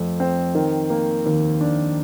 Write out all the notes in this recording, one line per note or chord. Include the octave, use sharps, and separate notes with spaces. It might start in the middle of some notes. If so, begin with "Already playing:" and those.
Already playing: F2 A3
C4
D#3
A#3
D#2
D4